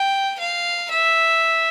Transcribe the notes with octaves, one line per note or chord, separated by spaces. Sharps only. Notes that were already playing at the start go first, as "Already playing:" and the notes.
Already playing: G5
F5
E5